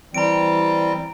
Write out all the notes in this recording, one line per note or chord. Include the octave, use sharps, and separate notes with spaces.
E3 G3 C4 A#5 D7